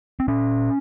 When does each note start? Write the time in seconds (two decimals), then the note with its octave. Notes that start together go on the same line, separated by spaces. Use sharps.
0.20 C4
0.28 A#2 C#4